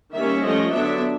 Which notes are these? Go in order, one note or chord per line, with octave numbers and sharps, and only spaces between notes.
D#3 G3 A#3 C#4 E5
F3 A3 C#4 D#5
D3 F#3 B3 D4 E5